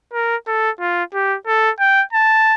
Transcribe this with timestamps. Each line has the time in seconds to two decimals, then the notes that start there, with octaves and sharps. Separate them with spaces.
0.13 A#4
0.47 A4
0.80 F4
1.14 G4
1.47 A4
1.80 G5
2.13 A5